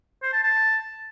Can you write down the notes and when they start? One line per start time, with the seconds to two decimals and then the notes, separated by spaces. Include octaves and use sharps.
0.23 C5
0.33 A5
0.43 A5